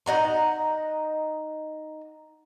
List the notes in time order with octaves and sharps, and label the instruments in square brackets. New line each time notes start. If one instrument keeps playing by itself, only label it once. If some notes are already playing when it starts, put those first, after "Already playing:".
[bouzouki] D#4 D#5 F#5 A#5